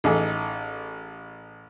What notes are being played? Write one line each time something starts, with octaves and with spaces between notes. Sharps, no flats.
A1 D#4 G#4 A4